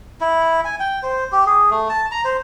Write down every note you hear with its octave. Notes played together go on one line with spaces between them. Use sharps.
E4
G#5
G5
C5
G4
G#4
A3
A5
A#5
C5